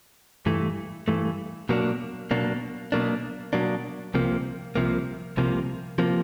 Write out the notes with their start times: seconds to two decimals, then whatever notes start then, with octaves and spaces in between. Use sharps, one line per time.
0.46 G2 E3 A3
1.08 G2 E3 A3
1.69 B2 F#3 A#3 D4
2.31 B2 F#3 A#3 D4
2.92 B2 F#3 A#3 D4
3.53 B2 F#3 A#3 D4
4.14 C2 C3 F3 A#3
4.76 C2 C3 F3 A#3
5.37 C2 C3 F3 A#3
5.98 C3 F3 A#3